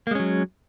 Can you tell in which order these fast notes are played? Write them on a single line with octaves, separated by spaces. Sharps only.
A#3 G#3 C#4 F#3